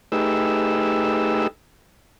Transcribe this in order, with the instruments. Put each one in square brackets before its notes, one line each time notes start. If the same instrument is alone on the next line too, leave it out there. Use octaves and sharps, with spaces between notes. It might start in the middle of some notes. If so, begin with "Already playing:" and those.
[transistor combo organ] A3 D#4 G4 G#4 B4 E6